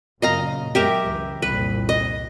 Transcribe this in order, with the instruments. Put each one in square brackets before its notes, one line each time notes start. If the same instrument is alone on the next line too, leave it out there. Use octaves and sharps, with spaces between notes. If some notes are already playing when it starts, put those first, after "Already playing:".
[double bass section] F#2 A#2 C#3 [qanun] D#5 F5 A#5
[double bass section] F#2 F#3 G#3 [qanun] G4 A#4 E5
[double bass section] C#2 E3
[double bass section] C2 F2 A#2 [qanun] B4
[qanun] D#5